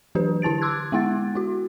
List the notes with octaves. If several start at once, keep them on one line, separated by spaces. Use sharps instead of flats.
E3 F#3 D4 G4 B4
D3 E4 A5 A6 D7
C6 D6 E6 F#6 G#6
G#3 B3 E4 F#5 A6
E4 F#4